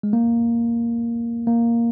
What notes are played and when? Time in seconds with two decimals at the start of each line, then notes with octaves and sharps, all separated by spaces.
0.03 G#3
0.13 A#3
1.47 A#3